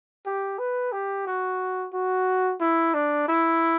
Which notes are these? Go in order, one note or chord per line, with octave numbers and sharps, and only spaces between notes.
G4
B4
G4
F#4
F#4
E4
D4
E4